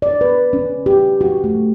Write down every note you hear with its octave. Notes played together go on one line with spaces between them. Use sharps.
D5
B4
C#4
G4
F#4
A3